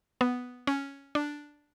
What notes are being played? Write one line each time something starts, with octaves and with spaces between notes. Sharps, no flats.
B3
C#4
D4